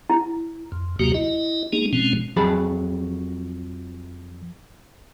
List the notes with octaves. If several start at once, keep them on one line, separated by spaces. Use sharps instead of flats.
E4
F2
D#2 C3 F#3 A#3 F#4 G4
E4 D#5
G#3 A#3 D4 D#4 G#4
B2 F3 G#3 C4 C#4
F2 F#3 G#4 A5 B5